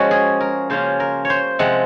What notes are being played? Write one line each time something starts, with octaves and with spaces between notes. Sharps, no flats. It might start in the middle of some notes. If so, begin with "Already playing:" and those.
Already playing: F3 G#3 C#4 F#4
G#4
A#4
C#3 F3 A#3 C#4 F4 C5
A#4
C#5
C5
C3 F3 G#3 F#5